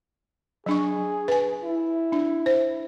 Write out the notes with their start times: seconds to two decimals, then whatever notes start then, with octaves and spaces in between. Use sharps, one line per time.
0.66 F#3 D4 G#4 C#6
1.28 B4 G#5
1.64 E4
2.12 D4
2.46 C5